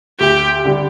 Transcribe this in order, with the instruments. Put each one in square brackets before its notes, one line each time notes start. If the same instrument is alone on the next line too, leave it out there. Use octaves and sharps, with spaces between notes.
[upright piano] D2 [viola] G4
[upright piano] D3 G3